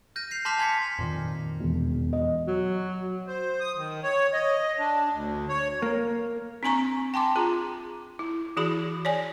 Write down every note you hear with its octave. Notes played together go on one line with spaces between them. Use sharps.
F6 G6 A#6 D#7
G6 C7 F7
A5 C6 D6 F6 B6 F7
G#5 C6 G#6 B6 C#7
F2 A#2 D#3
E1
D#5
F#3
C5
D#6
D#3
C#5
D#5
D4
D2
C#5
A#3
C4 D4 G#5 A#5 C#6
G5 A5 C6 D6
F4 G#4 A#5
E4
E3 E4 F#4 G#4 B5
C#5 D5 G#5